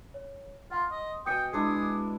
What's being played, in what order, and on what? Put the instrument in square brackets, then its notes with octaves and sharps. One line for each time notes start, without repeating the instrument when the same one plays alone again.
[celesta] C#5
[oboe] F4 [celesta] F#5 C6
[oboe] D#5
[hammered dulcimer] B2 D#5 G#5 [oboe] G5 [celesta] D#6 C#7
[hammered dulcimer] G#3 D4 E4 [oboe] G#4